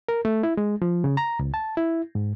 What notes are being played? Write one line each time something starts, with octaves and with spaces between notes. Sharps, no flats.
A#4
A3
E4
G#3
F3
C#3
A#5
C#2
A5
E4
G#2